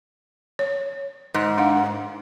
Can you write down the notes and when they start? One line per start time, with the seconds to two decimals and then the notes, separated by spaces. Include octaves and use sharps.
0.59 C#5
1.34 G#2
1.57 D4 F5 F#5